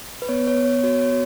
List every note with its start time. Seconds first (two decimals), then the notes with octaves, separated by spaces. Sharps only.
0.22 B4
0.29 B3 C#5
0.47 C#5
0.56 B3
0.64 C#5
0.84 F#4 C#5
1.02 C#5
1.10 F#4